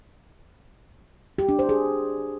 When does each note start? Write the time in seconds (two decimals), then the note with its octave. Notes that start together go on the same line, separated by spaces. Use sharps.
1.38 G4
1.49 D4
1.59 C5
1.69 G#4